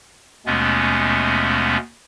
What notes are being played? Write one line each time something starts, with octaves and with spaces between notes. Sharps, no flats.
D#2 B2 G#3 A3 B3 C#4